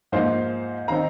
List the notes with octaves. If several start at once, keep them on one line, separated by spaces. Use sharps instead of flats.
G#2 F3 A#3 D#4 C5 F5
D#3 C4 D#4 F5 A#5